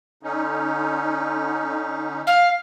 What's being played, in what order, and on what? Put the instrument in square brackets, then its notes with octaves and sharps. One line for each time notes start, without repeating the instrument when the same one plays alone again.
[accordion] D3 C#4 D#4
[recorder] F5